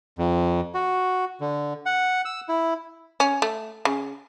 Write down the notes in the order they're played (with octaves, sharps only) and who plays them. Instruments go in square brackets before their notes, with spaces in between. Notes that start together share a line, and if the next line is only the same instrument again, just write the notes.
[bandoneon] F2
F#4
D3
F#5
E6
E4
[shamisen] C#4
A3
C#3